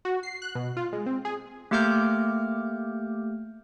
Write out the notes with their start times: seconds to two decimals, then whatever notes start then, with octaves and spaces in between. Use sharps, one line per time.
0.05 F#4
0.23 C7
0.42 F#6
0.55 B2
0.77 F4
0.93 G#3
1.06 C4
1.25 G#4
1.71 A3 A#3 G4 D6 F6 G6